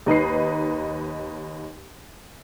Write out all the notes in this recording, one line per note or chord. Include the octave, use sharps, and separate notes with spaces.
D#2 D#4 B4 C7